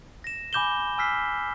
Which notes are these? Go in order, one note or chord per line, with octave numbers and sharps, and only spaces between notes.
A#6 E7
G#5 B5 D6 G6 E7 G7
G#5 E6 F6 B6 C7